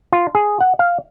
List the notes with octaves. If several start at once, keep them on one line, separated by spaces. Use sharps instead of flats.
F4
G#4
F#5
F5